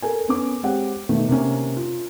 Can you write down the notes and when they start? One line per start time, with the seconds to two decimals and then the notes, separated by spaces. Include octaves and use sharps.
0.02 A4 A#4 G#5
0.28 B3 C#4 D6
0.63 G#3 C4 G4 C#5 F#5
1.09 B2 D#3 A3
1.29 C3 A#3 C#4
1.76 F4